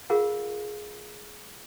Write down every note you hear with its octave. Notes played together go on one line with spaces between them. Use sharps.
F4 G#4 A#4 F5 F#5